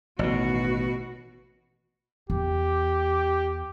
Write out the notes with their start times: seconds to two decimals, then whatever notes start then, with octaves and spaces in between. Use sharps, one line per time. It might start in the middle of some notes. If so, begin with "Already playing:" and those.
0.19 A1 B2 D#3 F#4
2.30 E2 G4